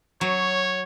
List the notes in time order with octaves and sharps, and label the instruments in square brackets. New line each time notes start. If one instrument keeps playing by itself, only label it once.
[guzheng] F#3 [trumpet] C#5